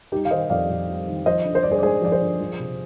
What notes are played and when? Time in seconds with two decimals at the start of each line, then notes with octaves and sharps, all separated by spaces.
0.12 G3 D#4 G4
0.25 F5
0.31 D#3 C5 D#5
0.50 F2 D5 F5
0.70 F2
0.88 G3
1.08 D#3
1.26 F3 C5 D#5
1.45 D3
1.55 C5
1.63 G2 D5
1.72 G#4 C5
1.79 D5
1.83 G#3 G#4 C5
2.02 F3 D5
2.12 G#4 C5
2.21 D3
2.40 F3
2.59 C3